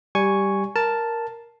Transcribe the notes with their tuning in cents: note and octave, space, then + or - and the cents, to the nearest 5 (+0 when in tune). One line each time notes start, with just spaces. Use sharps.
G3 +0 G#5 +0 C#6 +0
A#4 +0 A5 +0